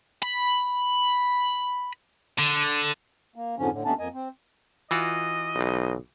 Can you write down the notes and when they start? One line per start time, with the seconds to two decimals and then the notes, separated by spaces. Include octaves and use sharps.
0.23 B5
2.39 D3
3.36 A#3
3.59 F2 G#2 D3 F3 C#4
3.72 A2 D3
3.85 D#2 A3 B3 C#4 D4 A5
3.99 F2 A#3 D#5 G#5
4.14 C4
4.91 E3 F4 F#4 D#5
5.55 B1